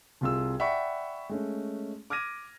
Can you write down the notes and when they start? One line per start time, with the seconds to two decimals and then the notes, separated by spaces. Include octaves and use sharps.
0.21 C2 C3 F4 G#4 E6
0.59 D5 E5 F#5 G5 B5 C#6
1.29 G#3 A3 C#4
2.10 D6 F6 G#6 A#6 D#7